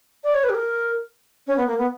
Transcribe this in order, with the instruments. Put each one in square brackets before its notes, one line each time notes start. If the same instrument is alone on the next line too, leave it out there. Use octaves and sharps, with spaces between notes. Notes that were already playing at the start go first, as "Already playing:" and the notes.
[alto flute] D5
C#5
B4
G4
A#4
C#4
B3
A#3
B3